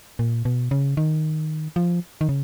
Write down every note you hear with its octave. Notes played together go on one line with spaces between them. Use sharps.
A#2
B2
C#3
D#3
F3
D#3
C#3